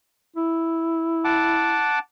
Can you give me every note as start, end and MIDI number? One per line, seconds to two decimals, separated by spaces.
0.37 1.88 64
1.25 1.99 78
1.25 1.99 81
1.25 1.99 86